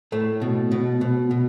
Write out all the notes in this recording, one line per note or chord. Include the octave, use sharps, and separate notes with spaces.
A2 A3
B2
B2
B2
B2